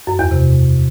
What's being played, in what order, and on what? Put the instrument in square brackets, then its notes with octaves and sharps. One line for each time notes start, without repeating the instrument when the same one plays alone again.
[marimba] F#2
E2
C3